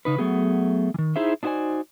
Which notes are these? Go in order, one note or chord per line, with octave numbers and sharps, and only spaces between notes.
C#3 D#4 B4
F#3 A3 B3 G#4
D#3 E3
D#4 E4 G#4 C5 E5
D4 D#4 F#4 C5 D5 G#5